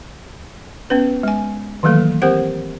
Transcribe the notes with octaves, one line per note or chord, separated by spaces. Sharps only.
B3 C#4 B4
G#3 G#5
D#3 E3 F#3 A3 A#3 A4
C4 G4 A#4 C5 F#5